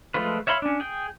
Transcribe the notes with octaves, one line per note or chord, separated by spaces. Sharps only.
F3 G#3 A3 F4 B4
C#5 E5 F5 B5 C6
C#4 D4
G#4 G5